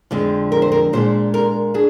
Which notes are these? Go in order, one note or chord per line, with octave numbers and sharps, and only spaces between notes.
F2 D3 F3 G#3 C4
A#4
C5
A#4
A#2 G#3 D4 C5
A#4
D4 G#4